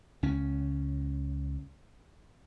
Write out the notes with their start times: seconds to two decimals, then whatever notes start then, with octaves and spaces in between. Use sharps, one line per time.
0.23 C#2 C#4